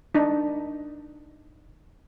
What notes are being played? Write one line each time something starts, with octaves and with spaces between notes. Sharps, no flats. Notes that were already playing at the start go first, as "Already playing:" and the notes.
D4 D#4